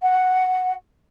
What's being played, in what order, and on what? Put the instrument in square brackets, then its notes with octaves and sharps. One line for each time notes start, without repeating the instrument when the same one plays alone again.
[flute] F#5